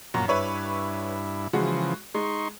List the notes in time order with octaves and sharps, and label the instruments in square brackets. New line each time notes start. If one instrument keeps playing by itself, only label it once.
[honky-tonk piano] F#2 [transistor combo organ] A#2 F#4 A#5
[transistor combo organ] G2 E4 [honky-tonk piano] B4 C#5 E5
[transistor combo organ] C#3 E3 F3 [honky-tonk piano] G#3 F#4
[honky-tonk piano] G#3 [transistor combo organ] D#4 C6 C#6